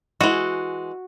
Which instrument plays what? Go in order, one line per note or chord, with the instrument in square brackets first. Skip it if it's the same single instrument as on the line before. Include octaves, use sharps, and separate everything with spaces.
[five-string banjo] E3 G#3 [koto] F#4